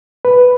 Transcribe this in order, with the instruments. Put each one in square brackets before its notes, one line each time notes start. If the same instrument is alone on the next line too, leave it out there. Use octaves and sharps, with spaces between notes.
[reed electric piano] B4